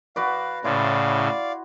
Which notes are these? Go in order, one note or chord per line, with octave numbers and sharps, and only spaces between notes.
F#4 B4 D5 F5
A2 C#3 E4 D5 F5 C6